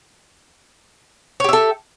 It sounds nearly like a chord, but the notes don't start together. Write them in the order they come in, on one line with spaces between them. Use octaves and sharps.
C#5 G4 E5 A4